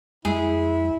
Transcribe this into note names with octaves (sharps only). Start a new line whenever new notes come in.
F2 G#3 E4 G#4